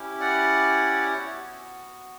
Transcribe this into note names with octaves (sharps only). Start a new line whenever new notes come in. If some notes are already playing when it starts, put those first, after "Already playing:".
Already playing: C#4 E4 G4
D5 F#5
B3 F#4 C#5 E5